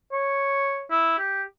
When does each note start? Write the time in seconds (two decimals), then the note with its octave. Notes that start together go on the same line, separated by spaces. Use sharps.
0.12 C#5
0.91 E4
1.19 G4